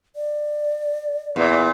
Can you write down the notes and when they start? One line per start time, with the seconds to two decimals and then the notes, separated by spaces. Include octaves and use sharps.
0.16 D5
1.36 E2 A#2